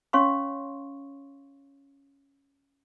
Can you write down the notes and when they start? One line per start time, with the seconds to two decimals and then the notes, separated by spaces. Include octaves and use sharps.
0.13 C#4 C#5 F5 C6 C#6